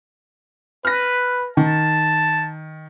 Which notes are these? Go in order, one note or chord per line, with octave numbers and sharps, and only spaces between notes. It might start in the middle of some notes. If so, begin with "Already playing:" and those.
B4 F6 A#6
D#3 A5